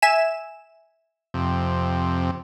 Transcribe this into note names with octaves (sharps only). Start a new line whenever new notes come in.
E5 G#5 E7
F2 C3